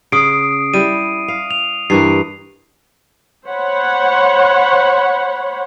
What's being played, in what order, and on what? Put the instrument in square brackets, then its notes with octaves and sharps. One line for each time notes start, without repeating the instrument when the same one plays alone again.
[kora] C#3 [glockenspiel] D#6 C7 D7
[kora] G3 E4 [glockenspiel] D#7
[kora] F5
[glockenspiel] F7
[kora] G2 E3 A#4 [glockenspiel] C7
[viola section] C5 C#5 F#5 B5